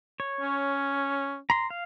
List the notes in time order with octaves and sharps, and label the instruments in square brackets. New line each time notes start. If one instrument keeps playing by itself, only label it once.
[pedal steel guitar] C#5
[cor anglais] C#4
[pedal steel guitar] A#5 C6
F5